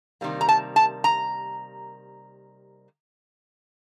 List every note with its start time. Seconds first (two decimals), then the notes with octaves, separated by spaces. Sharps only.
0.21 C3 D#3 G3 A#3
0.41 A#5
0.49 A5
0.76 A5
1.04 A#5